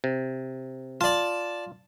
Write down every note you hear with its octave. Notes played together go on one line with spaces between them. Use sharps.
C3
F4 D5 A5